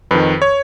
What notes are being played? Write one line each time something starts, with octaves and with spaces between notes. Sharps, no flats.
F2 D#3 B4
C#5